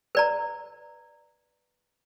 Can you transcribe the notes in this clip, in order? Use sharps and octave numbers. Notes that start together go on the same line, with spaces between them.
B4 D5 A#5